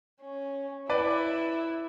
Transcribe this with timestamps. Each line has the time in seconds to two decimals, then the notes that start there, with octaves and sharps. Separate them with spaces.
0.21 C#4
0.90 E4 B4 D5